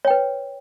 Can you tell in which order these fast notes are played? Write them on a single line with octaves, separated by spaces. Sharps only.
C#5 G5 B4